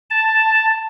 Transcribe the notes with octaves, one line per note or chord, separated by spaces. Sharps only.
A5